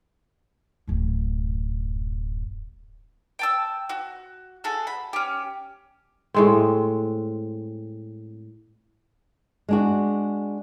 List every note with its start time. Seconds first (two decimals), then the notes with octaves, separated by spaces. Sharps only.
0.87 D1 F#2
3.39 G5 A5 E6
3.89 F#4
4.64 F#4 G#4 A4
4.87 B5
5.13 C#4 G4
6.34 A2 G#3 C4
9.69 G#3 D4 F#4